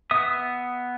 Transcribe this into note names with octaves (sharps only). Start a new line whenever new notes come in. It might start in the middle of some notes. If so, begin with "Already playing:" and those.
B3 E5 D#6